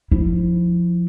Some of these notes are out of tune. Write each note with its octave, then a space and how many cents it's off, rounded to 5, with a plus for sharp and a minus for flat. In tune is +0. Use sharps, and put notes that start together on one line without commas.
F3 +0 E4 +0